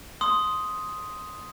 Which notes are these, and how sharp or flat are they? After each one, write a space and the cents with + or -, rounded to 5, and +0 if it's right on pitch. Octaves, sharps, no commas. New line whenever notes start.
C6 +0 D#6 +5